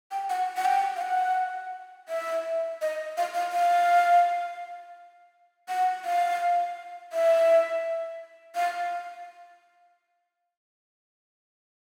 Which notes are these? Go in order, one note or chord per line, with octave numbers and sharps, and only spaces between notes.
G5
F#5
F#5
G5
F5
F#5
E5
D#5
F5
F5
F5
F#5
F5
E5
F5